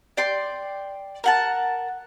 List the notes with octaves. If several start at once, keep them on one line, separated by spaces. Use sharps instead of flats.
D5 G5 C6
A#4 F#5 A5